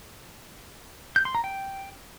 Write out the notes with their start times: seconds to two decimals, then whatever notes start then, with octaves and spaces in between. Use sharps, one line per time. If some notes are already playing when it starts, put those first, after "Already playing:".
1.16 G6
1.25 C6
1.35 A#5
1.44 G5